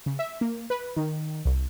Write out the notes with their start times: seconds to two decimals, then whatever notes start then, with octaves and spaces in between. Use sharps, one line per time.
0.06 C#3
0.19 E5
0.41 A#3
0.70 B4
0.96 D#3
1.45 C2